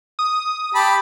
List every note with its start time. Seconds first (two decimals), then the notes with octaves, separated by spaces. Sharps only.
0.19 D#6
0.75 G4 A5 B5